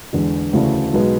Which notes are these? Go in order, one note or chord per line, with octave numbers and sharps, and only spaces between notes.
E2 D3 G#3
D2 C#3 E3 A3 D4
B1 B2 G#3 B3